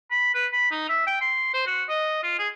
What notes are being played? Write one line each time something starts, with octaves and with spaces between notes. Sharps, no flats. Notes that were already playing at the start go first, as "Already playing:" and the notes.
B5
B4
B5
D#4
E5
G5
C6
C5
F#4
D#5
F4
G#4